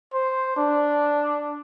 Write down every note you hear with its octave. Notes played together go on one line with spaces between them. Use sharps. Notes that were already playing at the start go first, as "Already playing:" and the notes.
C5
D4